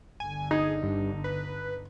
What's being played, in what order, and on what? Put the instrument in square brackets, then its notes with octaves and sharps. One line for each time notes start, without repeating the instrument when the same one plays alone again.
[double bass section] G1 D3 [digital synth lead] G#5
[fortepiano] D#4 [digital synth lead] G#4
[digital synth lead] G2
B4